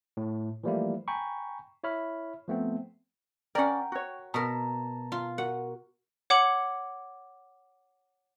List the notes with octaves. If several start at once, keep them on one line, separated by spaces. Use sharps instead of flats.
A2
E3 F3 G3 A3 A#3 E4
G5 G#5 A#5 B5 C#6
E4 C#5 E5 B5 F6
F3 A3 B3 C4
C#4 A#4 D5 F#5 G5
F#4 C#5
B2 A#4 A5 A#5
F4
F#4 A#4 F#5
C#5 F#5 D6 C#7 F#7